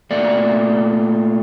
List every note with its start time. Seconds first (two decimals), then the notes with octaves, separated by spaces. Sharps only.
0.11 A#2 A3 D5